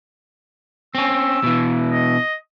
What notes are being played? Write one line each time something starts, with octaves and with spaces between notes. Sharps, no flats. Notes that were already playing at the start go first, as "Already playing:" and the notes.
C4 C#4 E6
B2 E3
D#5